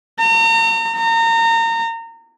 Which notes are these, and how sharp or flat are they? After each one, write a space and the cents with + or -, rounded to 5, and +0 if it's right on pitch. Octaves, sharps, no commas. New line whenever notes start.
A#5 -40
A#5 -30